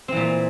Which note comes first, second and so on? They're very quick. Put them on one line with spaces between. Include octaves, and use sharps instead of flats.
C4 E3 A#2